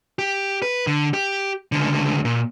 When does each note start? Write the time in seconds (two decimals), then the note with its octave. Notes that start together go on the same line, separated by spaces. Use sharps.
0.19 G4
0.62 B4
0.87 D3
1.14 G4
1.72 C#2 D3
2.25 A#2